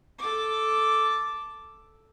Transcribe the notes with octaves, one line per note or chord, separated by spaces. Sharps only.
A4 D6